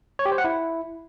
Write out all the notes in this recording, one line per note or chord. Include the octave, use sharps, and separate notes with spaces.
C#5
G4
C5
F#5
E4